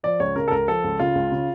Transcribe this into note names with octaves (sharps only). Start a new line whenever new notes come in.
F3 D5
C#2 C#5
C#3 A#4
A4
C#2 A#4
F3 A4
C#2
C#3 F4
C#2
C#3